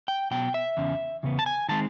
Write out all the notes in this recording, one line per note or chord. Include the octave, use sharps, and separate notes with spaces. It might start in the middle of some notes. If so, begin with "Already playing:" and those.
G5
B2 F#3 B3 G5
E5
E2 C#3 C#4
E2 C#3 B3
A5
G#5
D#3 G#3 C4 A5